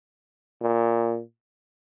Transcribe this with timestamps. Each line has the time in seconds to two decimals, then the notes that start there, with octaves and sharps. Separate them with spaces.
0.61 A#2